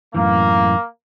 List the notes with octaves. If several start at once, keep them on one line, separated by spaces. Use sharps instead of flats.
F#2 A2 E3 A#3